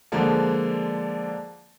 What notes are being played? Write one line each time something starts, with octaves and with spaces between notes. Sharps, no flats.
D3 F3 G#3 A#3